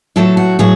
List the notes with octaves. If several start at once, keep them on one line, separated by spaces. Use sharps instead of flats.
A2 F#3 A3 A4
F#4
A2 F#3 G#4